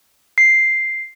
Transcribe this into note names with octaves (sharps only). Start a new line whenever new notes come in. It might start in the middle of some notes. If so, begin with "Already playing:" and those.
C7